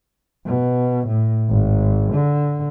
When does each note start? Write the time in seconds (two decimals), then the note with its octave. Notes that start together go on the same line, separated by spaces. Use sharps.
0.47 B2
1.07 A2
1.49 G#1
2.14 D3